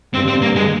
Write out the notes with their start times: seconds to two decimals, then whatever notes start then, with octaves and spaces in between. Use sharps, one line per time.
0.14 G2 C4
0.28 C4
0.42 A#3
0.56 G#3